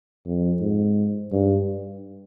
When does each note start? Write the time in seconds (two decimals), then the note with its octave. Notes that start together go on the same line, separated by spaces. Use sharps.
0.26 F2
0.60 G#2
1.32 G2